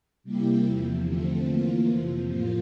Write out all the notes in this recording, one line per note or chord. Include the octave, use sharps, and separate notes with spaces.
C3 G3 A#3 E4 G4
E2 C3 F3
D3 F3 A3 C4
E3 A#3 F4
F2 C3 F3
A2 F3 A#3 F4